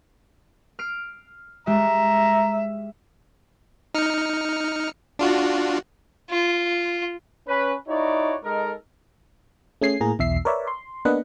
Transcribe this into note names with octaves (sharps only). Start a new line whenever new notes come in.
F6 C7 D7
G#3 G4 E5 A#5
D#4 F6 C#7
D4 F4 F#4
F4
C#4 B4
D#4 E4 F#4 C#5 D5
G#3 D#4 A4 A#4
A3 C#4 G#4 G#5 C7
A2 A#3 G#4 A#5
B1 E2 E5 C7
A#4 B4 C#5 D5 E5
C6
A#3 B3 D4 B4 D#5 F#5